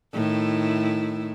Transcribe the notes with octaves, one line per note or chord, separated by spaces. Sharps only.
A2 D#3 E4